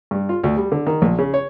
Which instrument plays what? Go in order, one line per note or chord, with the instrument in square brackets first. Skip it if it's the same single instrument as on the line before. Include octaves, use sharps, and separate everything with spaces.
[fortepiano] G2
F4
D2
G3
D3
D#3
A#1
C#3
C#5